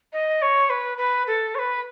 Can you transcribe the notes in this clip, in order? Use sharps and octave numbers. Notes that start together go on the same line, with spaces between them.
D#5
C#5
B4
B4
A4
C#5
B4